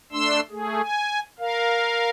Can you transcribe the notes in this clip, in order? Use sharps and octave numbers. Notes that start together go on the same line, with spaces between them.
A3 D4 C6 E6
A3 G#4
G#5
A#4 F5